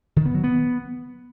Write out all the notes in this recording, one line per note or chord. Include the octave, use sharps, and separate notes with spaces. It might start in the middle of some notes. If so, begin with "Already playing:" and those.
D#3
B3
F#3
B3